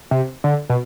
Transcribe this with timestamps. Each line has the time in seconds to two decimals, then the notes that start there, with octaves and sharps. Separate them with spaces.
0.11 C3
0.44 D3
0.70 B2